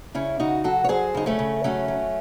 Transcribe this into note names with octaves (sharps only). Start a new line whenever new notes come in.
C#3 C#4 E4
C#3 D#4 F#4
F#3 F#4 A4
C#5
F#3 G#4 C5
C#3 D#4
A3 C#4
C#3
F#3 A3 C#4
F#3